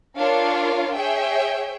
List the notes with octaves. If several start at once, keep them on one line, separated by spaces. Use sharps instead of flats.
D4 F4 A#4 C#5 F5
G#4 C#5 E5 G5